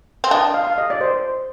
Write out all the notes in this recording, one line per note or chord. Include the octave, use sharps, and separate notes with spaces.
C4
D4 D#5
F5
F5
D#5
D5
C5